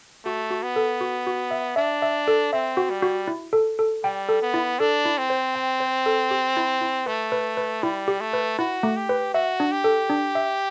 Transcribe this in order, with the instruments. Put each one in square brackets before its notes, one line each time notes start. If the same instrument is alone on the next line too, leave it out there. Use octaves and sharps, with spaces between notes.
[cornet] A3 [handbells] F#4
[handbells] F#4
[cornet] B3
[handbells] A4
F#4
F#4
E5
[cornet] D4 [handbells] E5
[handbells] E5
A4
[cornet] C4 [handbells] E5
[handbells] F#4
[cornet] G3
[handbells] F#4
E4
A4
A4
[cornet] G3 [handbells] G5
[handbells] A4
[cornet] B3
[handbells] E4
[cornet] D4 [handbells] A4
[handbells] E4
[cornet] C4
[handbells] C5
G5
C5
A4
G4
E4
E4
[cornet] A3 [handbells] B4
[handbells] B4
B4
[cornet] G3 [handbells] E4
[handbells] G4
[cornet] A3
[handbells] B4
[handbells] E4 [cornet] F#4
[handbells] A3
[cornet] G4
[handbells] B4
[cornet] F#4 [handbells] E5
[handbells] D4
[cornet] G4
[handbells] A4
D4
E5